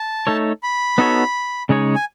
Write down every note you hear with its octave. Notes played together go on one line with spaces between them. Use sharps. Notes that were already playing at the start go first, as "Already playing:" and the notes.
Already playing: A5
A3 D#4 A4 C#5
B5
B3 D#4 F#4 A4 C#5
C#3 G#3 D#4 G#4 C#5
G#5